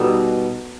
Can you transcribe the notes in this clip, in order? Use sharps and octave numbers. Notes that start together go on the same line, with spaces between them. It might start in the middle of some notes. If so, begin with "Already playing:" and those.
Already playing: B2 G3 B3 D#4 A4